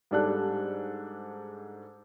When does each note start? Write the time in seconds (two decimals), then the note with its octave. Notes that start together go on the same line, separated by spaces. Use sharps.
0.11 G#2 G3 D4 A4 F#6